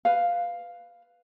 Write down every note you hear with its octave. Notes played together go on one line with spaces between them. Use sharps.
B4 F5